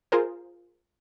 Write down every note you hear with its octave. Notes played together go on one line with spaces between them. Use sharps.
F4 G#4 A#4 C5